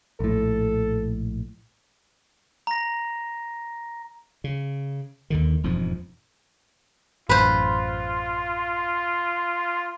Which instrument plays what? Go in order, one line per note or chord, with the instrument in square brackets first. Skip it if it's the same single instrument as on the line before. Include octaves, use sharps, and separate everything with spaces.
[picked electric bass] A#1 A2 [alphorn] A4
[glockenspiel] A#5 A#6
[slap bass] C#3
D#2 D3 D#3
E1 F2 G#2 F3
[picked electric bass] A1 F#2 [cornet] F4 [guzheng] B4 C5